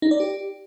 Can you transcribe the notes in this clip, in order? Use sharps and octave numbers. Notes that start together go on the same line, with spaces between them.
D#4
D5
G4